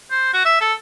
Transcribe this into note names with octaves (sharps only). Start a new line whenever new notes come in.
C5
F#4
E5
A4